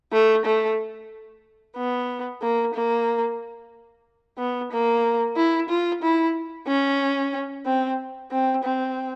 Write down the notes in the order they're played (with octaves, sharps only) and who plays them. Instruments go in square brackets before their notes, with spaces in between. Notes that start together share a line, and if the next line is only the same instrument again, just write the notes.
[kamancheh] A3
A3
B3
A#3
A#3
B3
A#3
E4
F4
E4
C#4
C4
C4
C4